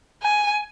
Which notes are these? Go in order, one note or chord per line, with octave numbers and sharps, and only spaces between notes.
G#5